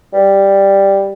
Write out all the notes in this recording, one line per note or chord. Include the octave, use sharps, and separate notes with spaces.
G3